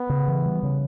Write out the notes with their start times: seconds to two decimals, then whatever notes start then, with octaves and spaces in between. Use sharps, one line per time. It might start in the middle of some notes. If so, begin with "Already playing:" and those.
Already playing: B3
0.09 C#3
0.28 E3
0.45 G3
0.63 C#3